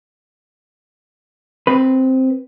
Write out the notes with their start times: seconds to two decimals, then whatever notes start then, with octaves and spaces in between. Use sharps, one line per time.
1.67 C4 B4